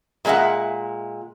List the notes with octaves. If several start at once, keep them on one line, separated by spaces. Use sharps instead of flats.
A#2 G#3 B3 E5 F#5